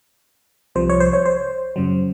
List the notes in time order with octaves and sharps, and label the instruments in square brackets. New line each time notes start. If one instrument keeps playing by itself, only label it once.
[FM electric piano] C2 C3 F3 C5
C#5
C5
C#5
C5
F#2 C#3 F#3